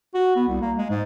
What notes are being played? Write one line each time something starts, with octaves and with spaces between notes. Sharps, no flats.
F#4
B3
C2
A#3
G#3
G#2